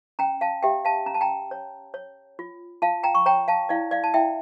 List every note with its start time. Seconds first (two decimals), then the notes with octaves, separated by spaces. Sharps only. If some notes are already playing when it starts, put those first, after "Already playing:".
0.19 C#4 G5 A#5
0.41 F5 A5
0.63 G4 E5 G5
0.85 F5 A5
1.06 C#4 A#5
1.14 A5
1.21 G5 A#5
1.51 C#5
1.94 C#5
2.39 F4
2.82 F4 F5 A5
3.03 G5 A#5
3.15 C#6
3.26 C#5 G5 A#5
3.48 F5 A5
3.69 E4 D5 F5
3.91 D5 F5
4.04 A5
4.14 E4 E5 G5